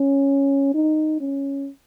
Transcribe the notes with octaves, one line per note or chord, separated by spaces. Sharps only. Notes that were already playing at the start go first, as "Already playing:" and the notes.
Already playing: C#4
D#4
C#4